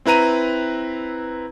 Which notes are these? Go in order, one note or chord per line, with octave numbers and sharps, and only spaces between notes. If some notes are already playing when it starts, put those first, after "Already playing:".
C4 E4 B4 A#5 D#7